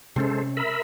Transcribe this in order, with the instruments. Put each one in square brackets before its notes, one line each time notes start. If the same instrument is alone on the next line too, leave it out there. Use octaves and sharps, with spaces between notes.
[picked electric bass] C3 C4 C#4 [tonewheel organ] G#3 A4 C5
[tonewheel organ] A#4 E5 B5